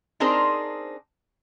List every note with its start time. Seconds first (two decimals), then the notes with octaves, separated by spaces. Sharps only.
0.20 C4 D4 D#4 G#4 A#4 C5